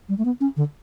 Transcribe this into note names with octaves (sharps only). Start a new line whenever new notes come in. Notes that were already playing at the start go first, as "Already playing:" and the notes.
G3
A3
B3
C#4
D3